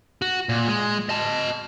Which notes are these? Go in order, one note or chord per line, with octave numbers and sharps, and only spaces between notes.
F#4
A#2
G#3
D#5 A5